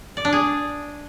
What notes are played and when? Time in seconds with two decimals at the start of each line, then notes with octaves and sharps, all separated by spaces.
0.17 D5
0.25 D4
0.33 G#4